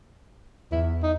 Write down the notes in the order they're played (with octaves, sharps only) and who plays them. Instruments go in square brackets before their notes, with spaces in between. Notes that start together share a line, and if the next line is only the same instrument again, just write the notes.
[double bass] E2 [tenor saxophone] E4
[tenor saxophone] D#4